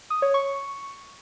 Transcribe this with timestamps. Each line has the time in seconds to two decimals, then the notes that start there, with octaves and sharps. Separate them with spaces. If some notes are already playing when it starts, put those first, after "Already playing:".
0.10 D#6
0.22 C#5
0.34 C#6